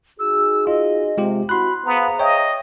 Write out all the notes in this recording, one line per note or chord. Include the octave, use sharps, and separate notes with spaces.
D#4 F#4 G#4 E6
F4 D#5
C3 G#3 F4 G4
C4 E4 F#4 B5 C6 F#6
B3 G#4 C5 F5 A#5
C#5 D#5 E5 G5